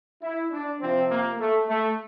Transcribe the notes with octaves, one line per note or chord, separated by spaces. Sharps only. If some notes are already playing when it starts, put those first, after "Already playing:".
E4
D4
C3 F3 C4
A#3
A3
A3